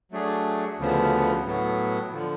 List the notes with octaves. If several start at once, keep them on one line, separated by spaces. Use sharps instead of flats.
F#3 A3 D4 G#4
D2 C#3 F3 B3
A2 F#3 B3
D3 F3